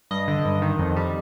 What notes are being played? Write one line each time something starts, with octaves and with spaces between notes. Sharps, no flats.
G2 D#5
D3
G2
D#3
F2
G3